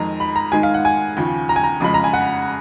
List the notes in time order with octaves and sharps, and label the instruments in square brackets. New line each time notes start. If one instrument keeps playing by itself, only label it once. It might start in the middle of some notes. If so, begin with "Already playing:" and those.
Already playing: [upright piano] F2 D#3 G#3 A#5
B5
A#5
G#2 D#3 G#3 G#5
F5
F#5
G#5
D#2 C#3 F3
A#5
G#5
A#5
F2 C#3 F3 G#3 B5
A#5
G#5
F#5